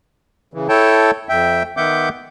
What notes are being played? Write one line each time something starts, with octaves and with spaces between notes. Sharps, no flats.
C#3 E3
E4 A4 C#5 G5 A5
F2 E5 G5
D#3 B3 E5 F#5 D6 G6